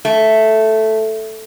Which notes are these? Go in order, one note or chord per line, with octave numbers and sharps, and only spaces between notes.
A3